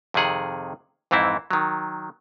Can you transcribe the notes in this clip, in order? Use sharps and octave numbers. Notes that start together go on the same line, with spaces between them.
F2 C3 D#3 G#4 F#5
F2 G#2 E3 C4 E4
D#3 F#3